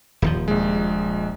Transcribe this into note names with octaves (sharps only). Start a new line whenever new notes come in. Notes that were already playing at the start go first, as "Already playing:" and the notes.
D#1 D#2 F3
A#1 G#3